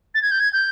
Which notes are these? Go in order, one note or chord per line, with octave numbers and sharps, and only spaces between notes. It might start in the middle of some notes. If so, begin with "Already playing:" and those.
A6
G#6
G6
G#6
G6